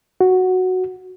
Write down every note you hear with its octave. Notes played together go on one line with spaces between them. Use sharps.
F#4